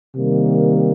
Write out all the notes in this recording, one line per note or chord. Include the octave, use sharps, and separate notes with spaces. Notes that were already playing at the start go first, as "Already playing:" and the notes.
C3 D#3 G3 A#3